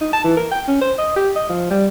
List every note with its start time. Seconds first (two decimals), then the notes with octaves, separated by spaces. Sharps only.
0.01 D#4
0.13 A5
0.24 E3
0.36 A#4
0.51 G5
0.68 C#4
0.81 C5
0.98 D#5
1.16 G4
1.36 D#5
1.49 F3
1.70 G3